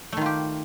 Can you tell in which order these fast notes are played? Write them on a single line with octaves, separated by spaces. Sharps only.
A3 D#3 F4 G4